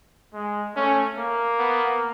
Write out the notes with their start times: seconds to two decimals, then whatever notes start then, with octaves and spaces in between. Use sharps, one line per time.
0.34 G#3
0.75 A3 C#4
1.18 A#3
1.60 B3